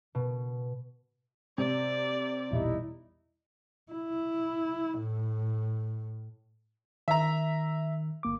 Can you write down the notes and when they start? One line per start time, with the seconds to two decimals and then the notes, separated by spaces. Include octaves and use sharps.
0.15 B2
1.58 C3 D5
2.51 A#1 E2 B2 G3 D#4 E4
3.92 E4
5.00 A2
7.08 D#3 E5 A#5
8.23 G1 A#3 D6